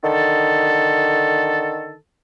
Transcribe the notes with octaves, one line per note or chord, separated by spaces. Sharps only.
D3 D#3 A4